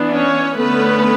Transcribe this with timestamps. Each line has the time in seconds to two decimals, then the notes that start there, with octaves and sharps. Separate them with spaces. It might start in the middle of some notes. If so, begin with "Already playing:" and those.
Already playing: E3 B3 D4
0.13 C#4 C#5
0.58 D3 A3 B3 C#4 B4